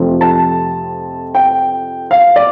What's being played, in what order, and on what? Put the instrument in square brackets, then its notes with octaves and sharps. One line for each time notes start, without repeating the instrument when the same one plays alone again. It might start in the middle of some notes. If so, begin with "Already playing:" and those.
Already playing: [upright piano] F2 C3 F3 A3 C4
A5
G5
F5
D5